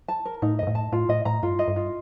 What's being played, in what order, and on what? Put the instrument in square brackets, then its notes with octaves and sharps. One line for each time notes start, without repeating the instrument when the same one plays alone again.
[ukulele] A5
A#4
[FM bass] A2 [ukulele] D#4
[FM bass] G2 [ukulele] D#5
[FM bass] A2
[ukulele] A5
[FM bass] A2 [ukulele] F4
[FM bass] A2 [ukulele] D#5
[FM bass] A2 [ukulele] A#5
[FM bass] G2 [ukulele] F4
[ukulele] D#5
[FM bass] G2
[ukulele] F4